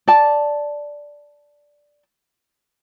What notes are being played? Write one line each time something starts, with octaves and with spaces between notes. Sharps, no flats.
D5 A5